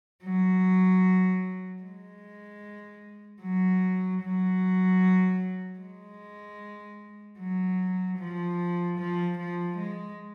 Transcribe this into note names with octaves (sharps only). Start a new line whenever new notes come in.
F#3
G#3
F#3
F#3
G#3
F#3
F3
F3
F3
G#3